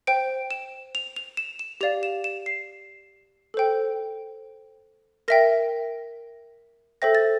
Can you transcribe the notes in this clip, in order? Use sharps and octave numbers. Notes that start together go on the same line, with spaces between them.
C5 G5 D7
E7
F7
F7
E7
E7
G4 D5 F5 F7
E7
E7
C7
A4 C5 G5
A#4 E5 G5 A#6
A4 C5 E5 G5 A#6
A6